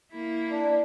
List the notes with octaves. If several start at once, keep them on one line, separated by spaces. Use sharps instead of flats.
A#3 E4
D4